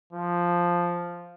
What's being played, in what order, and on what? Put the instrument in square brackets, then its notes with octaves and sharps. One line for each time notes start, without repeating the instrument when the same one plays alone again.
[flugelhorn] F3